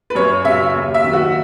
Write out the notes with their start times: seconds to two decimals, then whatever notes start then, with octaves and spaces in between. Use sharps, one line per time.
0.10 B4
0.15 F#2 C#5
0.44 C#3 F#3 E5
0.74 D#2
0.94 E5
1.04 D#3 F#3
1.13 F#4